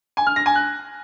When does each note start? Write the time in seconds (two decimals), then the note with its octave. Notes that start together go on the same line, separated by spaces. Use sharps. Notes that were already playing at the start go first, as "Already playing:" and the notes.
0.17 G#5
0.27 F6
0.36 A#6
0.46 G#5
0.55 F#6